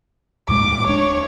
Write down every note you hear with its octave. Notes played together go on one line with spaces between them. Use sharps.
D#2 A2 G#3 D6
D1 D4 C#5